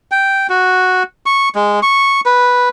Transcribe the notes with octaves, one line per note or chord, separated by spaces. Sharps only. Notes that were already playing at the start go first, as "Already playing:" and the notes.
G5
F#4
C#6
G#3
C#6
B4